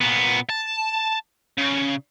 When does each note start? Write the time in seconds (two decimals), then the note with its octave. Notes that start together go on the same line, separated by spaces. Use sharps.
0.01 A#2 B3
0.50 A5
1.58 C#3